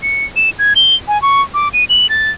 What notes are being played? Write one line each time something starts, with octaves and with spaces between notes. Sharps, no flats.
C#7
E7
G#6
G7
G#5
C#6
D6
D#7
F#7
A6